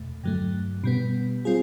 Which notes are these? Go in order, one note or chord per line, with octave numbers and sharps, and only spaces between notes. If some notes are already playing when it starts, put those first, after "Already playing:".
Already playing: E2 B2 A3
G2 D3 F#3 A3
B2 G3 B3
G3 C4 F4 G#4